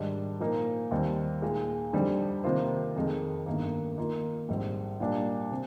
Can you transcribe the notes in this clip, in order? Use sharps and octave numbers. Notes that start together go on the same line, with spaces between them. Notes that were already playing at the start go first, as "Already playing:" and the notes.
Already playing: G#2 D#3 G3 D4
A#2 F3 A#3 D#4 A#4
D#2 D#3 G3 C4
A#2 G#3 D#4
F2 D3 G3 C4 D#4
C3 D#3 A#3 F4 C5
F1 F2 D#3 G#3
G1 G2 D#3 A#3
D#3 A#3 F4 A#4
A#1 G#2 G3 C4
A#2 G3 A#3 D4
C3